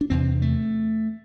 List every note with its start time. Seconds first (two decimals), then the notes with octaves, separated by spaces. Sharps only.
0.01 D4
0.10 E2 C3 C4
0.42 A3